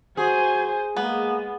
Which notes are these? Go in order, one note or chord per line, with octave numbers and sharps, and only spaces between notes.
F#4 G#4 C5 G#5
G#3 A#3 B3